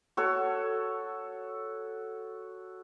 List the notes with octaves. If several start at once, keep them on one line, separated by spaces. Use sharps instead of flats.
F#4 A4 C#5